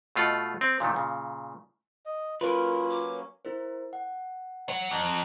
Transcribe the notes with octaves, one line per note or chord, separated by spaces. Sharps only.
B2 A3 F4 D#5 F#5
C4
A#2 D3 D#3 A3
A#2 C#3
D#5
F#3 A#3 C#4 F4 A#4 B4 B5 C#6
D6
E4 A#4 C5
F#5
F#3 F#5
F2 A#5 F#6